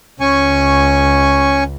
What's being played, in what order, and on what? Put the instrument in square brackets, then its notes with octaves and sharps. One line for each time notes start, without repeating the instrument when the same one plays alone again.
[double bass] C#2 [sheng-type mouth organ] C#4 G#5 C#6